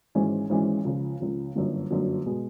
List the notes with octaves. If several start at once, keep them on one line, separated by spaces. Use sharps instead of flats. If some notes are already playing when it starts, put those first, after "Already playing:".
G#1 G#2 E3 G#3 C#4
G#1 G#2 E3 G#3 C#4
C#2 C#3 F3
C#2 C#3 F3
G1 F#2 D3 F#3 A#3
G1 F#2 D3 F#3 A#3
B2 G#3 B3